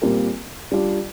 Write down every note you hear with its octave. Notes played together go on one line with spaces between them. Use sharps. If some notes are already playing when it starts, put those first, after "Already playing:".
A#2 G3 C4 F4 A#4
G3 D4 F4